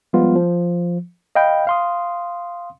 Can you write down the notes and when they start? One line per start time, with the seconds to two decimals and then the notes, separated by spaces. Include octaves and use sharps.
0.13 F3 G3 G#3 B3 F4
0.36 F3
1.35 D#5 F5 G5 B5 G6
1.67 F5 C6 D#6